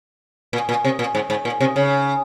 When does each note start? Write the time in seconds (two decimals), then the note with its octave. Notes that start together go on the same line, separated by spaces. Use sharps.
0.53 A#2
0.69 A#2
0.85 C3
0.99 A#2
1.15 G#2
1.30 G#2
1.45 A#2
1.61 C3
1.76 C#3